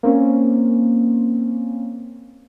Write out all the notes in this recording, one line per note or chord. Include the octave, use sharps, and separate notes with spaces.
A#3 C4 C#4